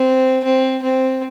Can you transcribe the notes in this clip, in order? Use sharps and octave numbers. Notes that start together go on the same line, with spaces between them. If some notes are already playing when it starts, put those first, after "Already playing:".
Already playing: C4
C4
C4